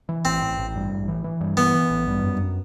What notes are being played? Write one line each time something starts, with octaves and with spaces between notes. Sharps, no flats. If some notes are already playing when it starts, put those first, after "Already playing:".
E3
A1 C4
A1
A1
G2
A1
E3
E3
G2
E3 B3
E3
A1
G2
F#2